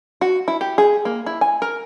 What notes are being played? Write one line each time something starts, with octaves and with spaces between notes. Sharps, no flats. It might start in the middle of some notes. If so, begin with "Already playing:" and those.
F#4
E4
G4
G#4
A#3
E4
G#5
A#4